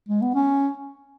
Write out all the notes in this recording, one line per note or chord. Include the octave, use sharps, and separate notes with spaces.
G#3
B3
C#4